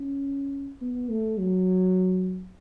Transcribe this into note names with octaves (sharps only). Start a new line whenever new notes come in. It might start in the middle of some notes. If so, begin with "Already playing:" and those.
Already playing: C#4
B3
A3
F#3